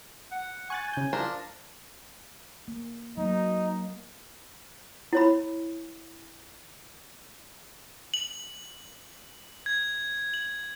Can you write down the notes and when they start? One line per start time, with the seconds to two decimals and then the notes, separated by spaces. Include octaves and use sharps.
0.32 F#5
0.70 G#5 C#6 F#6 A6
0.93 C#3 G6
1.13 F3 D4 A#4
2.68 A#3
3.17 F#3 A#3 D#4
5.13 E4 C#5 B5
8.14 F#7
9.66 G#6
10.34 F#7